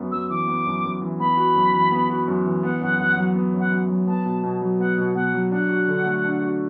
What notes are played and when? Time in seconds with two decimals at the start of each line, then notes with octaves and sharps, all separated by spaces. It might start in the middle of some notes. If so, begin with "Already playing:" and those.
Already playing: F#2 B3
0.11 F#2 E6
0.30 E3 D6
0.48 B3
0.66 F#2
0.84 F#2
1.02 E3
1.20 B3 B5
1.37 F#4
1.56 F#2
1.74 E3
1.92 B3
2.10 F#4
2.28 F#2
2.46 E3
2.63 B3 F#5
2.81 F#2 F#5
2.99 F#2 F#5
3.17 F#3 F#5
3.35 B3
3.54 F#2
3.60 F#5
3.72 F#2
3.89 F#3
4.07 B3 A5
4.26 B2
4.43 B2
4.62 F#3
4.80 B3 F#5
4.98 B2
5.15 B2 F#5
5.34 F#3
5.52 D4 F#5
5.69 F#4
5.88 D3
6.06 A3
6.24 D4
6.42 F#4